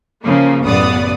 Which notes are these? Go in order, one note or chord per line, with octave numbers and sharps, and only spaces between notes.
C#3 F3 A#3
A1 F#2 C#3 B3 D5 D#6